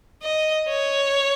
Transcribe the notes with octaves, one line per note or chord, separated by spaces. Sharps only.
D#5
C#5